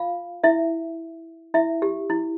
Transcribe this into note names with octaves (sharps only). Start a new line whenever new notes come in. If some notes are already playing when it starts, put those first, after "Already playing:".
Already playing: F4 F5
E4 E5
E4 E5
G4
E4